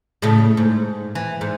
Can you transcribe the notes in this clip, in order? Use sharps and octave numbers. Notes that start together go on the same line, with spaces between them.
A2 C#3 A3
G#2
E3
G#2